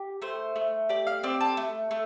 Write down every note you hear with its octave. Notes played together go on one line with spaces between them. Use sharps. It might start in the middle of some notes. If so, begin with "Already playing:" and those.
Already playing: G4
A3 C5
A3
G4 D5
F5
C4 D5
A4
A3
A3